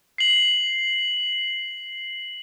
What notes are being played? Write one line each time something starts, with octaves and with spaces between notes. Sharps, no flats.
C7 F#7